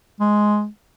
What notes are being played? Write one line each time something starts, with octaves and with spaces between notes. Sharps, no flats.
G#3